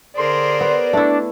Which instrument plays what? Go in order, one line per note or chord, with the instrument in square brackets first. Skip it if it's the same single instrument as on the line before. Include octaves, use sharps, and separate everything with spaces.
[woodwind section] D3 C6 [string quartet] G#4 A#4 C5 [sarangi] D5
[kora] B3
[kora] A3 E4 [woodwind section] D4